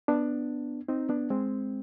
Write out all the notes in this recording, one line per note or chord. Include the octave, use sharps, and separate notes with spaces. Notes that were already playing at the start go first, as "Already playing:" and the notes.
B3 D4
C4 D#4
B3 D4
G#3 C4